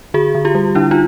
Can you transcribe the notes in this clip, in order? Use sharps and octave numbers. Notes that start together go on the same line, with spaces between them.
D3 F#4 G#4
D3
F4 G4
G3
D3 D4 E4
D#4 F4